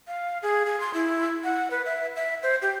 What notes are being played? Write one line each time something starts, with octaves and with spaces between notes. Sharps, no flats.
F5
G#4
G#4
C6
E4
F#5
B4
E5
E5
C5
G4